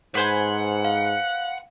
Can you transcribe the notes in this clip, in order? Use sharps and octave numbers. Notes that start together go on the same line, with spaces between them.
G#2 B4 C5 F#5 G#5
F5